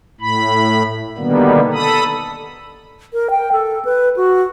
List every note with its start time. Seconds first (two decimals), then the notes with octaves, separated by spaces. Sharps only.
0.21 A2 B5
1.18 B2 D3 D#3 G3 A#3 B3
1.73 A4 B5 D#6
3.13 A#4
3.30 G5
3.52 A4
3.85 B4
4.16 F#4